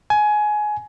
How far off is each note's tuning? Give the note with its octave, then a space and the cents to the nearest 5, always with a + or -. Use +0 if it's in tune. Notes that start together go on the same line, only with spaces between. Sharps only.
G#5 +20